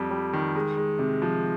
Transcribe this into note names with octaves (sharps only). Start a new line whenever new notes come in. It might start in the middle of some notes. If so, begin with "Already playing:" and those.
Already playing: F2 G3
G3
D#3
G#3
G#3
C3
F3